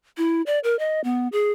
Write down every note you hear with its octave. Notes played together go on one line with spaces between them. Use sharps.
E4
D5
A#4
D#5
B3
G#4